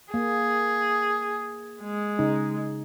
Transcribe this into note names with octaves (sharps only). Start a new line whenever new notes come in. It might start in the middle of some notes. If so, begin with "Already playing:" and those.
A#3 G#4
G#3
C#3 D#4